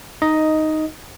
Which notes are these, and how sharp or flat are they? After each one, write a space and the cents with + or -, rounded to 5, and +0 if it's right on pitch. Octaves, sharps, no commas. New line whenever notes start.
D#4 +0 D#5 +5